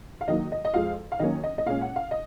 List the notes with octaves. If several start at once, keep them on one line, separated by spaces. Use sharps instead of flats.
F5
D#3 F#3 A#3 D#4 D#5
D#5
D#5
F2 F3 G#3 F5
F5
D#3 F#3 A#3 C#4 D#5
D#5
D#5
A#2 G#3 C#4 F5
F#5
F5
D#5